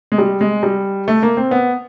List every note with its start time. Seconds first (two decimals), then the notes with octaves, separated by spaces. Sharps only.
0.12 G#3
0.18 G3
0.41 G#3
0.63 G3
1.08 A3
1.23 A#3
1.37 C4
1.51 B3